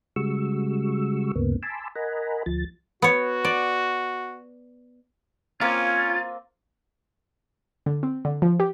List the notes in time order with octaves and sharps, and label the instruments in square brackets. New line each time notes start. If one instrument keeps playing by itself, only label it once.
[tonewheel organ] C#3 G3 G#3 F#4 C#6 E6
D2 G2 C#3 A#3 B3
G#5 A5 B5 C6 D6 E6
A#4 D#5 F#5 G#5 A#5 B5
D2 F3 A6
[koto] B3 C#5 [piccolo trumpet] F#4
[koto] D5
[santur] A#3 C4 [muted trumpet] C#4 [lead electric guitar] F4 [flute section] G#6
[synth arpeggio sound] D3
C4
D3
F3
G4